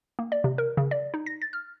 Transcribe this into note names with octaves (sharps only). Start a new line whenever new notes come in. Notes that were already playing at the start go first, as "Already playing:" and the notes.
A#3
D5
C3
A#4
C#3
D5
D#4
A#6
A6
F6